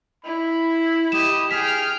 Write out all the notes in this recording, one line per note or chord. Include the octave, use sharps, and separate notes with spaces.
E4 B5
G4 D#5 E7
G#4 G5 F6 B6